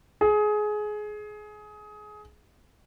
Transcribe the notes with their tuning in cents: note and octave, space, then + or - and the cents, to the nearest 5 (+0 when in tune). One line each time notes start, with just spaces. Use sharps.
G#4 +20